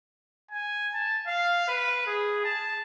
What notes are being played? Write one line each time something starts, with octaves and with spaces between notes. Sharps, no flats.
G#5
A5
F5
B4
G#4
A5